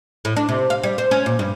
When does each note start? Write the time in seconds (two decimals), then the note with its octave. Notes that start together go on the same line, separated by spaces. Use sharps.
0.25 A2
0.36 D4
0.49 C3
0.70 F5
0.83 G3
0.98 C5
1.11 C#4
1.26 A#2
1.39 G2